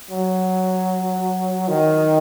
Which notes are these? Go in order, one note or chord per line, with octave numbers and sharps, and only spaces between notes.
F#3
D#3